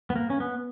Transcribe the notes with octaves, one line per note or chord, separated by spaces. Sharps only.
B3
A#3
C#4
B3